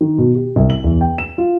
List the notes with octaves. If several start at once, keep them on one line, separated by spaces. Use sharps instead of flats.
D#3
B2
G4
C2
F#7
E2
G5
E7
F4